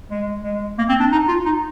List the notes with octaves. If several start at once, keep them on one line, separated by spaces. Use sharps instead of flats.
G#3
G#3
A#3
C4
D4
D#4
F4
D#4